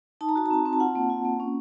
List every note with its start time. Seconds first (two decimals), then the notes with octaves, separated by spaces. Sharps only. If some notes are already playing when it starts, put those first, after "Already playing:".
0.21 D#4 A5
0.29 A#5
0.36 F#4 A5
0.46 A#5
0.51 C4 A5
0.65 C4
0.73 A5
0.80 F4 F#5
0.95 A#3
1.10 F4
1.25 A#3
1.40 C#4